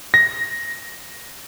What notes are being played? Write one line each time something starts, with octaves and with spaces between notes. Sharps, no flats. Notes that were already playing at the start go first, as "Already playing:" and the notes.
A#6